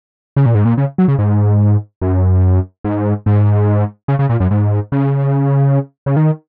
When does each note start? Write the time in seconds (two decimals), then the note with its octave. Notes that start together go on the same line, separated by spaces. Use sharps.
0.36 C#3
0.46 A#2
0.55 G#2
0.65 A#2
0.78 C#3
0.98 F#3
1.08 C#3
1.19 G#2
2.02 F#2
2.84 G#2
3.26 G#2
4.08 C#3
4.19 C#3
4.29 A#2
4.40 F#2
4.51 G#2
4.92 C#3
6.06 C#3
6.16 D#3